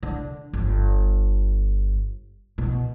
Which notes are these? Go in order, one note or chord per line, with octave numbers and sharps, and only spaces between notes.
D3
G1
B2